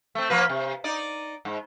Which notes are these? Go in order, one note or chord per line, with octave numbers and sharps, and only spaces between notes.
A3 C4
F3 A#3 B4
C3
D#4 D5
G#2